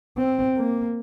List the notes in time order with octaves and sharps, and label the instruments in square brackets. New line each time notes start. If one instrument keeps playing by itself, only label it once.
[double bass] C4
A#3